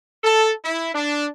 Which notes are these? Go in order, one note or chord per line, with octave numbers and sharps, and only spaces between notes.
A4
E4
D4